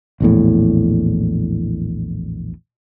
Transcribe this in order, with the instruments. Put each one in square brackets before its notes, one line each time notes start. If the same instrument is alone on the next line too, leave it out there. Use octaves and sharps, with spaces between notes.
[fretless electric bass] A#1 E2 A2